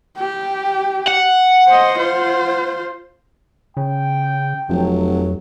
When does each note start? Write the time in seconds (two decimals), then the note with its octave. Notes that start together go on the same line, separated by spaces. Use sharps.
0.18 G4
1.08 F#5
1.68 C5 D#5
1.98 F4 C5
3.77 C#3 G5
4.69 F1 F2 F#3